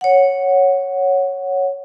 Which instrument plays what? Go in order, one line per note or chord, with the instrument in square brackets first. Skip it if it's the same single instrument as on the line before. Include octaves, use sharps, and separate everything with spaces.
[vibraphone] C#5 F#5